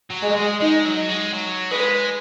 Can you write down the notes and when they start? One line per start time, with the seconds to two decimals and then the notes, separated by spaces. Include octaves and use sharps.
0.10 F#3
0.23 G#3
0.35 G#3
0.60 G#3 D#4
0.85 F#3
1.09 G#3
1.34 F#3
1.71 G#3 B4